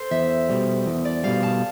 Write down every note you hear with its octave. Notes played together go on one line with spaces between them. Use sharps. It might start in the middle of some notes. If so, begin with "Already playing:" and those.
Already playing: A4 C5
E2 E5
B2 G3
E2
D5
B2 G3 F5
A5